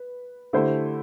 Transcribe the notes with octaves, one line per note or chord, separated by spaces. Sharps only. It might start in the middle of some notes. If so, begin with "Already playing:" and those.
Already playing: B4
D3 A3 E4 G4 C5